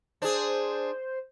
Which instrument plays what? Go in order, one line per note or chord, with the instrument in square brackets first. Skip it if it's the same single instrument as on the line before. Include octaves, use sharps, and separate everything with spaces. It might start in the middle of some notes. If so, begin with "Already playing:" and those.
[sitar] D4 G#4 [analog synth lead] C5